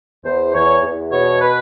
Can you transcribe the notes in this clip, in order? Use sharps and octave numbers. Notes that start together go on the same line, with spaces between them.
E2 C5
E2 C#5
E2
B2 C#5
B4